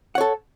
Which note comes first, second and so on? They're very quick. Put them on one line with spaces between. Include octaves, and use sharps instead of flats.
F#5 C#5 A4